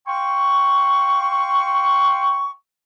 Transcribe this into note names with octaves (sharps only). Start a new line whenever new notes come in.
F5 G5 C6 C#6